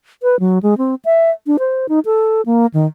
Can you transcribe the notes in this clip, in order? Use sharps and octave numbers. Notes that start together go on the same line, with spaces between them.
B4
F#3
G#3
C4
E5
D4
C5
D#4
A4
A#3
D#3